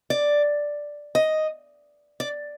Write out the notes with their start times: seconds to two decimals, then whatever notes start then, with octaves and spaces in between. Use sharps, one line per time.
0.10 D5
1.15 D#5
2.20 D5